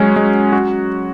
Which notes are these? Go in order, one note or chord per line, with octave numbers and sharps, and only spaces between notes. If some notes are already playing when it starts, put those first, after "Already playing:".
Already playing: F#3 G#3 C#4
G#3
F#4